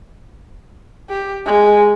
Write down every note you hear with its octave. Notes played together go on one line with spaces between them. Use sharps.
G4
G#3